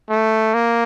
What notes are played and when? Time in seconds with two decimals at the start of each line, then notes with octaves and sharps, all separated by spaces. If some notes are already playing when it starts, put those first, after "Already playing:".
0.10 A3
0.54 A#3